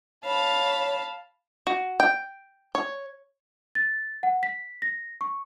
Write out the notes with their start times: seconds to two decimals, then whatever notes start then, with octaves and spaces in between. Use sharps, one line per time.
0.25 C#5 F5 A5 B5
1.67 F#4
2.00 G5
2.75 C#5
3.75 A6
4.23 F#5
4.43 B6
4.82 A#6
5.21 C#6